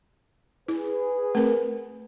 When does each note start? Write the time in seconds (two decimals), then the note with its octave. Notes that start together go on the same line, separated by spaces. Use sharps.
0.68 E4 G#4 B4
1.35 A3 C4 A#4